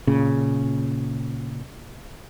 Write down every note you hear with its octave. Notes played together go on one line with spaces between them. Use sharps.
A#2 C#3